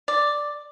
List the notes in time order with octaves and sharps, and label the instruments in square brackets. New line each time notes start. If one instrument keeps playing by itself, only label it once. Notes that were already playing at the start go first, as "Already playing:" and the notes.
[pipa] D5